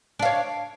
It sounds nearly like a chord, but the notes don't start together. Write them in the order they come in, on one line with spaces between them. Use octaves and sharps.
D4 F5 C#5